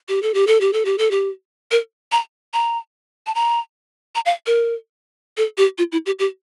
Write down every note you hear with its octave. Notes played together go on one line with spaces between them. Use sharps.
G4
A4
G4
A4
G4
A4
G4
A4
G4
A#4
A#5
A#5
A5
A#5
A#5
F5
A#4
A4
G4
F4
E4
G4
G4